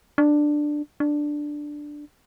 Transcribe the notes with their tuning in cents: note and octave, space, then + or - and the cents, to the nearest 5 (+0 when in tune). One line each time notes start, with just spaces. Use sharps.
D4 +10
D4 +5